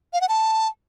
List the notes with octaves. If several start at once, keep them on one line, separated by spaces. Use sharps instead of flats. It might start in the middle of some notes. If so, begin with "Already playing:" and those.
F5
F#5
A5